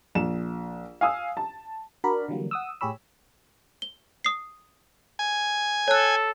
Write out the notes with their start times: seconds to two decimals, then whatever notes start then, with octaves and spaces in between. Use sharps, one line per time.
0.15 A#1 E7
1.01 F5 G#5 D#6 E6
1.37 A5
2.04 D4 F#4 A#4 D5 B5
2.28 D3 E3 F#3 G3 A#3
2.51 F#5 D#6 E6
2.81 A2 G4 G#4 C#5 B5 E6
3.82 G7
4.25 D#6 C7
5.19 G#5
5.88 A4 C#5 F#6